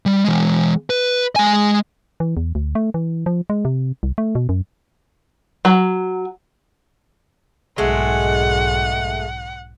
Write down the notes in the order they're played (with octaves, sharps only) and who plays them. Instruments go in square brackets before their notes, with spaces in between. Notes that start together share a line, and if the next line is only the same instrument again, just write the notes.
[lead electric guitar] G3
E3 G#3
B4
G#3 G#5
[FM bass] E3
E2
D2
A3
E3
F3
G#3
C3
C2
A3
B2
F#2
[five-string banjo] F#3
[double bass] B1 G#2 [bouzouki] G#3 A3 [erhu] F#5